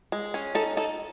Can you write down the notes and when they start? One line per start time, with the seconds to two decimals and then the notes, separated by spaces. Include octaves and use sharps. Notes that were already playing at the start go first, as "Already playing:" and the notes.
0.12 G#3
0.34 C#4
0.55 D#4 A4
0.77 D#4 A4